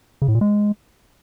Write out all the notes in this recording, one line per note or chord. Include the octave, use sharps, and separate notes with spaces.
C#3
A2
A#2
G#3